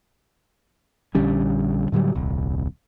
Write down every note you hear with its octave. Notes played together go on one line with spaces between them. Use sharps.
A#1 D3 G3 C#4
A2 D3 F#3 G3
D#1 C2